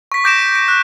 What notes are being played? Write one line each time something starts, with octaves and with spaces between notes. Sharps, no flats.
C#6 B6
D6 G6 A#6 D7 E7
B6
D7
F#6